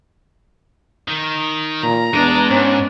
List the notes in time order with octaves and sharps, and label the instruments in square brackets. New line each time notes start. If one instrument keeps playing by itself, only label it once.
[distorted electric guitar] D#3
[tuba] A#2 [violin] A#5
[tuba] E2 [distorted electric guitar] G#3 D#5 [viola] B3 D4
[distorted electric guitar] G#2 [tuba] C#4